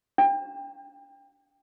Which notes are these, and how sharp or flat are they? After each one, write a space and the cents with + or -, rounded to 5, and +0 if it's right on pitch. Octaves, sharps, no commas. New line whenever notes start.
D4 -30